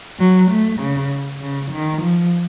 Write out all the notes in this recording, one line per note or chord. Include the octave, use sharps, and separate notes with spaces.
F#3
A3
C#3
C#3
D#3
F3